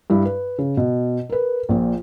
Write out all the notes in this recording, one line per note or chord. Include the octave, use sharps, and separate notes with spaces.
G2 E4
B4
C#3
B2
A#4 B4
A#1 A#2